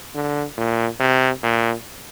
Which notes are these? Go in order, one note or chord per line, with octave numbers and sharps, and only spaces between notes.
D3
A#2
C3
A#2